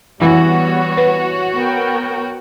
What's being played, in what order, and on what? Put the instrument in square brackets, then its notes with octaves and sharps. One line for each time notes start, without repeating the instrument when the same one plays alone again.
[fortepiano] E3 [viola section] G3 B3 [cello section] F#4 C#5
[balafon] B4
[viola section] B3 A#4 G5